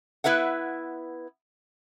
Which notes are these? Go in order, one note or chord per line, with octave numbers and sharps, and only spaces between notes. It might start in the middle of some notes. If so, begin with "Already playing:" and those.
B3 E4 B4 E5 F#5